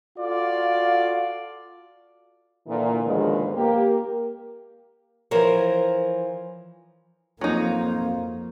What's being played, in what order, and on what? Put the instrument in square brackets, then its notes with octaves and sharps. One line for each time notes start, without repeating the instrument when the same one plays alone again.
[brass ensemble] F4 F#4 A4 D5 F5
[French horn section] A#2 D3 E3
D#2 G#2 B2 D3 F3 G#3
A#3 G4 A#4
[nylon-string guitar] E3 F3 A#4 C5 C#5
[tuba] F2 [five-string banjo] F#3 D#4 [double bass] A#3 [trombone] F4